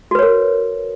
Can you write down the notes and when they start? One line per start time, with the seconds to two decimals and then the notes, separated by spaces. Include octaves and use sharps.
0.11 F#4
0.15 B4
0.19 C#5
0.23 A#4